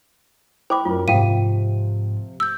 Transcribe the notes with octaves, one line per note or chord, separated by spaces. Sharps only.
E4 C5 G5 B5 D6
F#2 F4 A#4
G#2 C3 F3 F5 G5 D#7
E6 G6